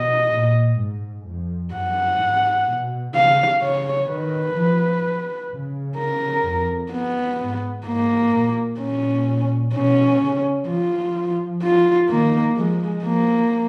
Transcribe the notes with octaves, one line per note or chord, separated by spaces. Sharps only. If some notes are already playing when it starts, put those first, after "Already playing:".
Already playing: B2 D#5
A#2
G#2
F2
F#2 F#5
G#2
B2
C#3 F5
C#3 C#5
D#3 B4
F3
C#3
A#4
F2
B3
G#2
G#2 A#3
A#2
A#2 C#4
B2 C#4
C#3
F3 F4
F4
D#3 A#3
F3 G#3
F3 A#3